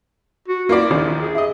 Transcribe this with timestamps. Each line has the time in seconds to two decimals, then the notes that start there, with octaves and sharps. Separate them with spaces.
0.48 F#4
0.69 A#3 E4 F4 D5
0.90 A#1 D#2 F3
1.21 G#4
1.35 E4 D#5